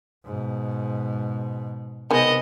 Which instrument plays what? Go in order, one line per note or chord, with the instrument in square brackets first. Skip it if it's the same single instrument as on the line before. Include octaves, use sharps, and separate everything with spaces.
[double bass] G#2 B2
[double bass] C3 [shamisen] D#3 G#3 [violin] B3 D#5